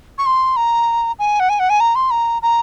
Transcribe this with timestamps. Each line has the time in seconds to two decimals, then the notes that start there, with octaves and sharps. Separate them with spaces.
0.18 C#6
0.26 C6
0.56 A#5
1.19 G#5
1.40 F#5
1.49 G#5
1.59 F#5
1.70 G#5
1.80 A#5
1.95 C6
2.11 A#5
2.42 A#5